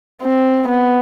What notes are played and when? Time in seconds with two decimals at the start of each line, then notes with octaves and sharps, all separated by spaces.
0.22 C4
0.68 B3